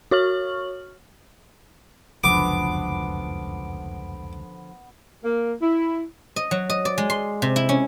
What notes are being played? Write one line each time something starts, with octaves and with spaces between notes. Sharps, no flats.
F#4 C#5 C#6 F6 F#7
F1 C#2 F#2 D3 F3 B3 B4 D6
A#3
E4
D#5
F#3
D#5
D5
G#3
C6
C3
E4
C#4